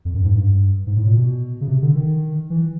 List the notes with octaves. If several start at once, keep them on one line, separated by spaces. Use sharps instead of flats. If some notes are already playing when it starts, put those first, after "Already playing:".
F2
F#2
G#2
G2
G#2
A2
A#2
B2
C#3
C3
D3
D#3
E3